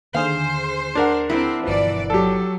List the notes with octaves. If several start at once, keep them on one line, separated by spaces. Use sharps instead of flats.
D#2 D3 G#4 C5 F5
D4 A#4 F#5
C4 E4
G1 B2 E3 F3 D5
F#3 G4 A4